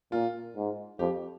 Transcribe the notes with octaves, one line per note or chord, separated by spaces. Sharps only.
A#2 F4
G#2
F2 G4